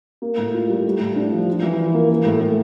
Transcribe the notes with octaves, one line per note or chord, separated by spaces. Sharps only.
A#3
A2
F4
G3
A3
A2
D4
F3
F4
E3
E3
A#3
A#3
A2
A2